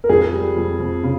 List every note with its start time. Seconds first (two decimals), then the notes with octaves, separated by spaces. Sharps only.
0.04 A#4
0.09 F2 G#4
0.33 G3
0.56 F2
0.80 F2
1.03 C#3